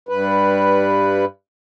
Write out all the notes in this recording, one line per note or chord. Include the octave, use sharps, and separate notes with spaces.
G2 B4